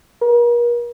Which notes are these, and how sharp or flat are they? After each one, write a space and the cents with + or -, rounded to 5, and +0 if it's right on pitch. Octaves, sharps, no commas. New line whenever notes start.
A#4 +40